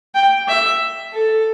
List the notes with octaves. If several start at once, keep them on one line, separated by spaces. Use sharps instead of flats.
G5
E5
A4